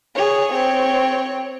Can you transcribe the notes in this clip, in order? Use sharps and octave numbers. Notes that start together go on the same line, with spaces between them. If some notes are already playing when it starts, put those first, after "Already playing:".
G#4 C#5
C4 C#5